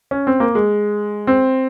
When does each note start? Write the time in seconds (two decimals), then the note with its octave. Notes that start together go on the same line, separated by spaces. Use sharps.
0.11 C#4
0.27 C4
0.40 A#3
0.55 G#3
1.27 C4